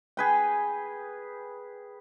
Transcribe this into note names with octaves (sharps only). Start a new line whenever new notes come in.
G#4 B4 G5